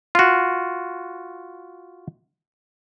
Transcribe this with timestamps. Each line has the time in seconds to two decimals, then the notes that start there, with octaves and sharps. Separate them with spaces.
0.15 F4 F#4